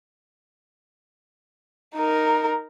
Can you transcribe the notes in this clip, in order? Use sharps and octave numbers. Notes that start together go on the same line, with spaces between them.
D#4 A#4